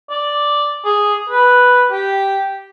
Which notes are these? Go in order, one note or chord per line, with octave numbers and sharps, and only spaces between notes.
D5
G#4
B4
G4